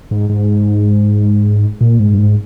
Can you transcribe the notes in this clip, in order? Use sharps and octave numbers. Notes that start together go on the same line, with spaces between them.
G#2
G#2
A#2
G#2
G2
G#2